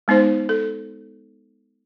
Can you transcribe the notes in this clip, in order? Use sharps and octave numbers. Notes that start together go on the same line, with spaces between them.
G#3 B3 D#4 C5
A4